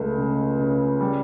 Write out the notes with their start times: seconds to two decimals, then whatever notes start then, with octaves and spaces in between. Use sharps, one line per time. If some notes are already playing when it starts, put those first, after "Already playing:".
Already playing: C#2 A3
0.18 C#3
0.59 C#3
1.01 G3